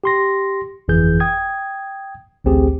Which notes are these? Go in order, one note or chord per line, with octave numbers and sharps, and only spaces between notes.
G4 C6 A#6
G1 F2 E3 G#4 G6
G5 D#6 G#6
A1 D2 C4 G4 G#4